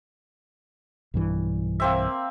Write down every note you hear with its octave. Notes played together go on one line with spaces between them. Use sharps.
B1 G2 E3
A#3 C4 E5